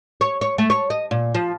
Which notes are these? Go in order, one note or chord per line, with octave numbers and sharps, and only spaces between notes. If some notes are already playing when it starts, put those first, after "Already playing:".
C#5
C#5
A3
C#5
D#5
A#2
F3